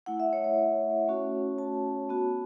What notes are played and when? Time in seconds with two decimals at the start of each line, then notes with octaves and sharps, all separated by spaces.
0.06 A3 E4 F#5
0.20 E5
0.33 C#5
0.44 C#5
1.08 A3 C#4 F#4
1.58 A5
2.09 B3 F#4